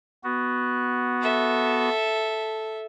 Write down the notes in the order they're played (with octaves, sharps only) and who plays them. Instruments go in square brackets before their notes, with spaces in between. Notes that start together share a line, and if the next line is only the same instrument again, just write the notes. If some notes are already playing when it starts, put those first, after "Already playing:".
[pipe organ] B3 F#4
[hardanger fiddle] A4 E5